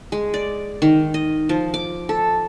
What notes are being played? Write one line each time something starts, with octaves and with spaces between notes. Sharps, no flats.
G#3
D5
D#3
D#5
F3
D6
A4